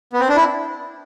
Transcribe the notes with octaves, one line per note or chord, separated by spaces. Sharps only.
B3
C4
D4
E4